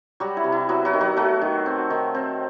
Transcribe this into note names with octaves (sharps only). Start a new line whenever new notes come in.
F#3 G3 F#4
E4
C3
E4
F#3 B3 F#4
F#3 F#4
D#3
F#3 F#4
F#3 A3 F#4
D#3
C4
D#3
C4